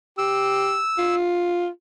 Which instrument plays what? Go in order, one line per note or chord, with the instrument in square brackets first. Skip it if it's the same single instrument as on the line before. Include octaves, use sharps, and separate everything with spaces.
[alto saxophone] G4 [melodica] E6
[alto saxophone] F4